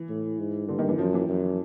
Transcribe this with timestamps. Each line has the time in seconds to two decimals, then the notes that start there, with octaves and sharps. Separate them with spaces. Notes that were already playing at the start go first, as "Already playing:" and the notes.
Already playing: E3
0.09 A2
0.39 G#2
0.68 G2 D3
0.78 D#3
0.88 E3
0.98 F#2 F3
1.14 E3
1.28 F#2